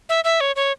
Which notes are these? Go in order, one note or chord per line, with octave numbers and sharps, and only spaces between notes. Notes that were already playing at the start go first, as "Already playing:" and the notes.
E5
E5
C#5
C#5